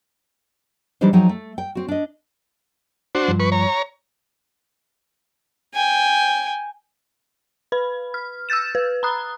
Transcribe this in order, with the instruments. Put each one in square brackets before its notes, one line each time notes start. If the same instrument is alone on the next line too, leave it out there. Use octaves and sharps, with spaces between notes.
[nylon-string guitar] E3 G3 D4 D#4 G4 C5
F3 F#3 G#3 D#4 G5
A3
G5
C4 F#4
D4 D#5
[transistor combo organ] D4 F#4 C5
[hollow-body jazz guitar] G2 F3
[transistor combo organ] B4 C#6
C#5 A#5
[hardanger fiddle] G5 G#5
[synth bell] B4 B5
F6
E6 F6 G6 A6 E7
B4
A#5 B5 D#6 F#6